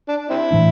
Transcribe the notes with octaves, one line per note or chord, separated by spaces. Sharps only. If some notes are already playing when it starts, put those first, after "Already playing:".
D4
C4 E4
A2 E3 A3 D4